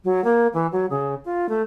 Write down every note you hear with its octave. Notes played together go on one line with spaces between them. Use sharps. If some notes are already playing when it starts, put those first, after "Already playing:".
F#3
A#3
E3
F#3
C#3
F4
A3